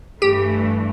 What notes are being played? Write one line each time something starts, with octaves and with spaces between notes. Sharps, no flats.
G2 E3 A3 G4